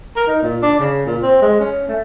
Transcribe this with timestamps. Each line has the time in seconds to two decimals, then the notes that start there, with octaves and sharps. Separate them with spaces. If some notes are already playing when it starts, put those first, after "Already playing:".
0.16 A#4
0.28 D#4
0.42 A#2
0.62 D4
0.79 C#3
1.06 A#2
1.22 C4
1.41 G#3
1.60 C#4
1.88 A3